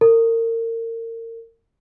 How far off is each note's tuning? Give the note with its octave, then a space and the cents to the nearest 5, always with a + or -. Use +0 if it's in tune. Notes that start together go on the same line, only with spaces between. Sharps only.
A#4 -35